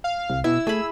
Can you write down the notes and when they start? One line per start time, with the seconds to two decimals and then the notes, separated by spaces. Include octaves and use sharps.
0.04 F5
0.30 C2
0.44 B2 E4 E6
0.67 A3 G#4 B5